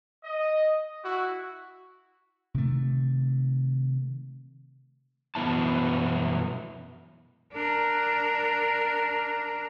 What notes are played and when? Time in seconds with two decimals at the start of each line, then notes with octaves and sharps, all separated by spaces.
0.24 D#5
1.04 E4 F#4
2.54 C3 D#3 A3
5.35 F#2 B2 E3 B3 E4 A5
7.53 D4 A#4